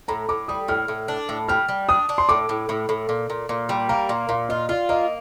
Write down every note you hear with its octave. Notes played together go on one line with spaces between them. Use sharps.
A2 A#5
A2 D6
G3 D#6
A2 F6
A2
D4
A2
G3 F6
G3
D4 D#6
D4
C6
A2 D6
A2
A2
A2
A#2
A#2
A#2
G3
A#3 A#5
A#2
A#2 F5
F4 D#5
F4 D5
A#3 D#5